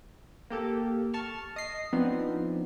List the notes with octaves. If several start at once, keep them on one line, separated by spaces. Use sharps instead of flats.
A#3 G4 A4
A5 C#6 F6
D#5 C7
F3 B3 C4 D4 D#4